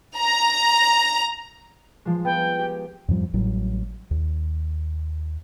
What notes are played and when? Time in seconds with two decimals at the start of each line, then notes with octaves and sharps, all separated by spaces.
0.18 A#5
2.05 F3 G#3
2.25 B3 G5
2.59 G4
3.08 F2 G#2 F3 G3
3.34 A1 A2 F#3 G3
4.11 D#2